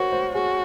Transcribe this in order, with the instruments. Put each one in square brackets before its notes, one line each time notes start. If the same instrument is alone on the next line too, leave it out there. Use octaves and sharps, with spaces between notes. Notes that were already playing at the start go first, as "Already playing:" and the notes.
Already playing: [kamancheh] F#4 [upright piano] A#4 C5 C#5
[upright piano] C5
[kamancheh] F#4 [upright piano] G#4